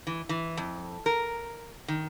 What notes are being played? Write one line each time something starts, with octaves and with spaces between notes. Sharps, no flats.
E3
E3
F2
A#4
D#3